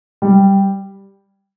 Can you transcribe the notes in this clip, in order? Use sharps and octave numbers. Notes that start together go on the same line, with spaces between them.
G3